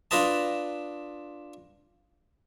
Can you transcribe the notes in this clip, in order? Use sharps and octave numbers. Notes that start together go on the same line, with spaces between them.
D4 F4 B4 D#5 A5